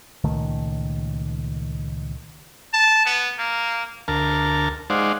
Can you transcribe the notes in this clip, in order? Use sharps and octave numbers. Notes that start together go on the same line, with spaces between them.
C#2 A#2 D#3 A3
A5
B3
A#3
D2 A#4 A5 F6
G#3 D#4 C5 D5 F5 F#5